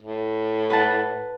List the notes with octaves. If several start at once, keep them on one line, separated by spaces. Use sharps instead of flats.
A2
B4 F#5 A5